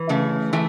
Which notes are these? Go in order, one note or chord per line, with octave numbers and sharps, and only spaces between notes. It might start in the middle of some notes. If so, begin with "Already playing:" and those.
Already playing: E3
C#3 A3
E3 A3